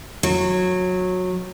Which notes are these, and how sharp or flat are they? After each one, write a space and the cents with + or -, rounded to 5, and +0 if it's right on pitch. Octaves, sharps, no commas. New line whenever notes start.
F#3 -15